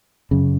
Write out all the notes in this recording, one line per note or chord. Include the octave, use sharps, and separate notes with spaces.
F#2 C#3